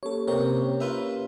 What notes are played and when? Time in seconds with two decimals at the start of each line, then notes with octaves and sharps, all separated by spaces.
0.03 A#3 C#4 G4 A4 C#5
0.28 C3 A#4 C#5
0.80 F4 B4 E5